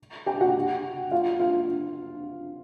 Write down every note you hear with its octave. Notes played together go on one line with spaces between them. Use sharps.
G4 G5
F#4 F#5
F4 F5
F4 F5